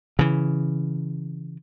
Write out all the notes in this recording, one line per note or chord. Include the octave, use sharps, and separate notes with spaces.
C#3 E3